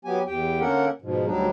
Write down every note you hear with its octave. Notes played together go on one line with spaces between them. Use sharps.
F#3 B3 G4 G#5
E2 G4 G5
D3 A#3 C#4 A4 A#4 F#5
G#2 B2 F3
D2 F#3 G3 D4 D#4